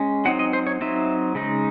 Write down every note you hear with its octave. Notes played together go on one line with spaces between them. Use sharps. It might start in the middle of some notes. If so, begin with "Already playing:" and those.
Already playing: G#3 C#4
F#3 C4 D#4 F#5
D#5
C5
C#5
F#3 C4 D#4 E5
C#3 G#3 D#4